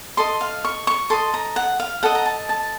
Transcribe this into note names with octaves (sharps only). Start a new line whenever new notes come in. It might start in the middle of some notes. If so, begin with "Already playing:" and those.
A4 D#5 C6
F5
C#6
C#6
A4 D#5 C6
A#5
F#5
F5
A4 D#5 F#5
A#5
A5
A5